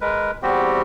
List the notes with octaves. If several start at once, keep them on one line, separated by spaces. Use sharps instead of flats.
G#3 A#4 B4
E2 G3 C4 F#4 G4